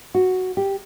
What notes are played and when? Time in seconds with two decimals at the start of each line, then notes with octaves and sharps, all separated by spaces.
0.14 F#4
0.57 G4